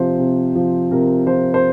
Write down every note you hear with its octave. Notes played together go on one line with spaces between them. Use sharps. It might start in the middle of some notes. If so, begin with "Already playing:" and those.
Already playing: C3 F3 C5
C3
F3
C3 A#4
F3 C5
C5